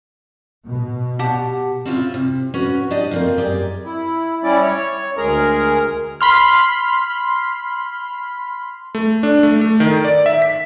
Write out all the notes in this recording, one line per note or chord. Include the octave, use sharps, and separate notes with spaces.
B2
G4 F#5 A5
C4 C#4 E4 F4
C3
C#4 F#4 B4
D4 G4 D5 D#5
A#3 C4 F4
F#2 G4 G#4 D5
E4
G3 C#4 E4 D5
C#5
D2 G#3 G#4 A#4 A#5
B5 C6 F6
A3
D4
A3
A3
D#3
D5
E5
B6